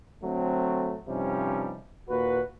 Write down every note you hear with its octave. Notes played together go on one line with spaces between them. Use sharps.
D3 F#3 A3 C4
G2 C3 F3 G3 C#4 D#4
D#2 A#2 F#4 B4